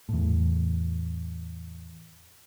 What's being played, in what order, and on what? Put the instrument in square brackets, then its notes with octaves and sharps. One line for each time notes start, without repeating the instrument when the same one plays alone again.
[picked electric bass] E2 A2